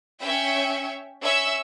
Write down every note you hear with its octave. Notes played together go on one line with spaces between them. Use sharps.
C#4 E5 G5
C#4 E5 E6